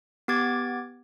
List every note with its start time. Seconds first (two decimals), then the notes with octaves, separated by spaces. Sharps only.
0.28 B3 G4 D6 G#6 A6